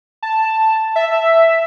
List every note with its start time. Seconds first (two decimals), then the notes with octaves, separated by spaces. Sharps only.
0.23 A5
0.96 E5